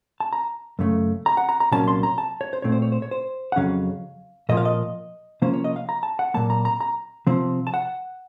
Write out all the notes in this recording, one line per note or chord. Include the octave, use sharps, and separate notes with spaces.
A5
A#5
F#2 C#3 A3
A#5
F#5
A#5
A#5
C2 A#2 F#3 A#3 C#4 A5
C6
A#5
A5
C#5
C5
A#2 A3 C4 C#5
C5
C#5
C5
C#5
C5
F#5
F2 C#3 F#3 C#4 F5
A#2 F3 A#3 D#5
F5
D#5
C3 F3 A#3 C#4 C5
C#5
D#5
F5
A#5
A5
F#5
A#2 F#3 A#3 A5
A#5
A#5
A#5
C3 F3 C4
A5
F#5